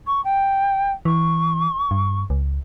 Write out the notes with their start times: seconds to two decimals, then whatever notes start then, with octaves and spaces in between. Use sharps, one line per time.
0.06 C#6
0.24 G5
1.05 E3 C#6
1.91 G2
2.30 C#2